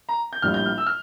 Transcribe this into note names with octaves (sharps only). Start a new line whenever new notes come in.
A#5
G6
A#1 A2 G3 A#3 F6
G6
F6
E6
F6